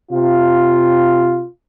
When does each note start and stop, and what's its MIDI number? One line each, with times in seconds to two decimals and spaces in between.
0.10 1.44 48
0.10 1.44 65